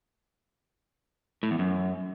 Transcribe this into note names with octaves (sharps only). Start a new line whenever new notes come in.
A2
E2
F#2